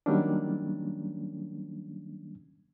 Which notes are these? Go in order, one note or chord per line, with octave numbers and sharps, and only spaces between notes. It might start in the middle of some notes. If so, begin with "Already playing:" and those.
D#3 F#3 G3 A#3 C#4 D4